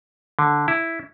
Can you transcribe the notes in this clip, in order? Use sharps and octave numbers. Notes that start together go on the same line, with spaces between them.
D3
E4